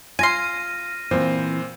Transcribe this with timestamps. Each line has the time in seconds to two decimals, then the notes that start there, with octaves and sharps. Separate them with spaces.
0.19 F4 G#5 C6 F6 A#6 D#7
1.11 A#2 E3 C4 C5